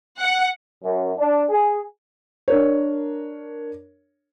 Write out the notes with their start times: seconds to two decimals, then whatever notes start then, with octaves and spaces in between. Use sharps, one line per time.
0.18 F#5
0.83 F#2
1.17 D4
1.49 G#4
2.48 D4 A#4 C#5